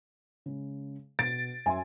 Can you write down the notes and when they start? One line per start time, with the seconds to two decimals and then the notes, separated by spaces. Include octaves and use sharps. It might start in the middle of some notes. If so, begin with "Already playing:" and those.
0.46 C#3 G#3
1.19 B2 A6 D7
1.66 F#2 E5 G#5 C6